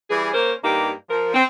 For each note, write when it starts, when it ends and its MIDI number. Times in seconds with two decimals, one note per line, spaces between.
0.10 0.30 52
0.10 0.30 55
0.10 0.30 68
0.33 0.53 58
0.33 0.53 61
0.33 0.53 70
0.33 0.53 72
0.63 0.91 43
0.63 0.91 58
0.63 0.91 63
0.63 0.91 67
1.09 1.31 53
1.09 1.31 70
1.34 1.43 60